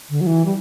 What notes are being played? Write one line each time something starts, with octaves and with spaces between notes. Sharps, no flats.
D3
F#3
E3
G3